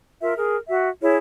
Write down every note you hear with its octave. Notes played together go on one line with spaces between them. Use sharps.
F4 A#4 E5
G#4 A#4
F#4 E5
E4 G#4 C#5